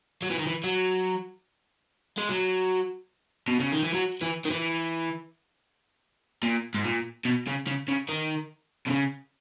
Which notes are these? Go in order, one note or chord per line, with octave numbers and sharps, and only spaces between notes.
F#3
E3
D#3
E3
F#3
G#3
F#3
B2
C#3
D#3
E3
F#3
E3
D#3
E3
A#2
G#2
A#2
B2
C#3
C#3
C#3
D#3
B2
C#3